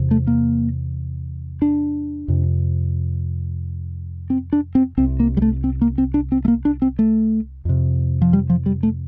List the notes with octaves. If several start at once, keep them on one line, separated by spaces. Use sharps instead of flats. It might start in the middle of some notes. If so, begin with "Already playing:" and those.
Already playing: E2 C3
A3
A#3
D4
F2 C3
C4
D4
C4
C2 C3 C4
A#3
G3
A3
C4
A#3
C4
D4
C4
A3
A#3
D4
C4
A3
F2 C3
F3
G3
F3
G3
A3